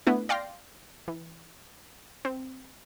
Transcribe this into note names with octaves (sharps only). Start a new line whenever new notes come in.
A3 B3 D4 E4
D5 F5 G5 C6 A#6
E3
C4